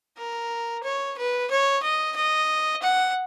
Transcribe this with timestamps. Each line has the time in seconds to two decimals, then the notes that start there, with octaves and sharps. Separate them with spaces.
0.18 A#4
0.83 C#5
1.18 B4
1.50 C#5
1.83 D#5
2.16 D#5
2.82 F#5